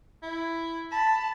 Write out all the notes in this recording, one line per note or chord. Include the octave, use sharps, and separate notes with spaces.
E4
A5 B5